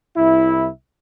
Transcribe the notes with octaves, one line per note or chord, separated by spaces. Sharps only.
C2 E4